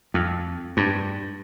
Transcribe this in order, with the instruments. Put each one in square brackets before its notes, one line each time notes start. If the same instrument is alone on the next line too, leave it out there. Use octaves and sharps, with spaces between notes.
[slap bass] F2
G2